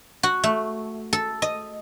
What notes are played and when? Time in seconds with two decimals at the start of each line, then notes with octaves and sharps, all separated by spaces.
0.23 F#4
0.44 A3
1.13 A4
1.42 D#5